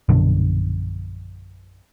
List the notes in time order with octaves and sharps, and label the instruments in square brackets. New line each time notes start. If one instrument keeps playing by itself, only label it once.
[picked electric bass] A#1 F#2 B2 D3